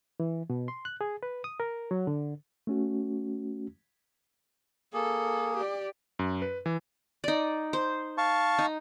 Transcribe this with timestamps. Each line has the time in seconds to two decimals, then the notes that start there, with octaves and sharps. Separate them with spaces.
0.20 E3
0.50 B2
0.68 C6
0.85 F#6
1.01 G#4
1.23 B4
1.44 D#6
1.60 A#4
1.91 F#3
2.07 D3
2.67 A3 C#4 F#4
4.94 A#3 G#4 A4
5.57 G4 D5
6.19 F#2
6.42 B4
6.66 E3
7.24 D#4 D5
7.73 C5
8.18 F5 A5 C#6
8.59 D#4